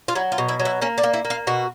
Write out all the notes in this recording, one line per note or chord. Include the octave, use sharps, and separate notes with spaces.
F4
F#3 E4
F4
B2
E4
F#3
E4
A#3 C#4
D4
A#3
E4
A#3
F4
B2 F#4